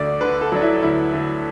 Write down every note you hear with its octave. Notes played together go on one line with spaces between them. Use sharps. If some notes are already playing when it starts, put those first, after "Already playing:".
Already playing: D2 D3 F#4 D5
D3 B4
A4
F#3 D4
E4
D2 E4
D2